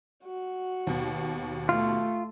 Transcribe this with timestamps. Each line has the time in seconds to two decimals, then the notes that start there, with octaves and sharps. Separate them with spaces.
0.24 F#4
0.87 D#2 B2
1.69 A3 F4